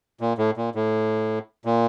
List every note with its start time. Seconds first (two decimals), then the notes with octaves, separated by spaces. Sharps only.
0.21 A#2
0.38 A2
0.57 A#2
0.75 A2
1.65 A#2